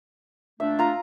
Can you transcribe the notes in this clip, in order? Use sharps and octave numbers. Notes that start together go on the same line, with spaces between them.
A#2 A3 D4 E5
F4 A#5